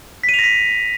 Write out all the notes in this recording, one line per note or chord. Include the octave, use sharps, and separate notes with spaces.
B6
D#7
F7
A#6
B6